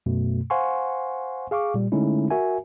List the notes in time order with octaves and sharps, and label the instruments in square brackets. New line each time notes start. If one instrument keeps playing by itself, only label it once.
[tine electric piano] F#2 B2 A3
C5 F5 F#5 G#5 C6 C#6
G#4 F5 C#6 D6
A#2 G3
D3 G#3 A3 C#4 D#4 E4
F#4 A#4 E5 G#5